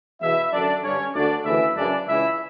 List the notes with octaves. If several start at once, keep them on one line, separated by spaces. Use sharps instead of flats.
E2 B2 E4 E5
F#2 D3 D4 D5
G2 D3 C#4 C#5
D2 D3 D4 D5
D2 C#3 E3 E4 E5
F#2 C#3 E3 D4 D5
C#2 C#3 E3 E4 E5